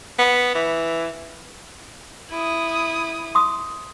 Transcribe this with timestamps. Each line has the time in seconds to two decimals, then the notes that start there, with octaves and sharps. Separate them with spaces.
0.19 B3
0.55 E3
2.30 E4 D#6
3.35 C6 D#6